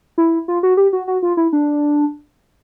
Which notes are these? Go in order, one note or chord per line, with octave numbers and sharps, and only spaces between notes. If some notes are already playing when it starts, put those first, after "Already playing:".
E4
F4
F#4
G4
F#4
F#4
F4
E4
D4